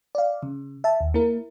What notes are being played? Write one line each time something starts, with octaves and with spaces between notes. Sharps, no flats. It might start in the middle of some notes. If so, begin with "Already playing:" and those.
D5 F5
C#3
E5 A5
D#2
A#3 E4 A#4